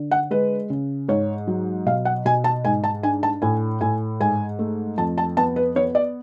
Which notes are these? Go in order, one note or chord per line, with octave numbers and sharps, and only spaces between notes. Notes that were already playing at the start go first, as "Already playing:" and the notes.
Already playing: D3
F#5
G#3 B4
C#3
G#2 C#5
F#3
B2 F5
F#5
B2 G#5
A5
G#2 G#5
A5
D4 G#5
A5
A2 G#5
A2 G#5
G#2 G#5
A3
F2 A5
A5
B3 A5
B4
B3 C#5
D5